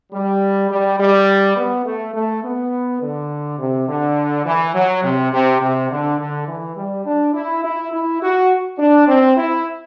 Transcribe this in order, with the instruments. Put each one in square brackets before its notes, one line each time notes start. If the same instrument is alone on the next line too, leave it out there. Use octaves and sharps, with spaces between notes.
[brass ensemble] G3
G3
G3
B3
A3
A3
B3
D3
C3
D3
E3
F#3
C3
C3
C3
D3
D3
E3
G3
D4
E4
E4
E4
F#4
D4
C4
E4